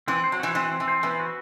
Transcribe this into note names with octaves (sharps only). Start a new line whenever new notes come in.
E3 C4
C5
F#3
E3 F#4
E3 C4
C4
E3
C5
E3 B3
F#4